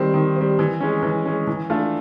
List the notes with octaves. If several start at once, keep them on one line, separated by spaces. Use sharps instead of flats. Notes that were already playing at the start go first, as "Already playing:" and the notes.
Already playing: D#3 G3 C4
D#3
G3 C4
E3
G#3 C#4
E3
G#3 C#4
E3
A3 D4 F4